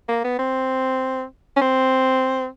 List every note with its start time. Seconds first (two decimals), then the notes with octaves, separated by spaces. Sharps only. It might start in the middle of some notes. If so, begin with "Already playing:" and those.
0.09 A#3
0.24 B3
0.39 C4
1.57 C#4
1.62 C4